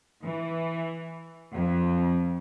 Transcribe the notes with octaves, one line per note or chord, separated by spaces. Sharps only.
E3
F2